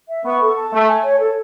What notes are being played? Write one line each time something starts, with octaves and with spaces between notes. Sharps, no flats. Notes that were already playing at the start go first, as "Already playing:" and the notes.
E5
B3 C#6
A4
A5
A3 A4
G#5
C#5
A4